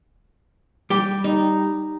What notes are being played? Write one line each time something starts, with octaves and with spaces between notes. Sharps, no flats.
G3 G4
D#4